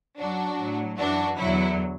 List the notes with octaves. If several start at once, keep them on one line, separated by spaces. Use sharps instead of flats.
F#2 F#3 D4 F#4
A2 F#3
F#2 E3 D4 F#4
E2 D3 F#3 E4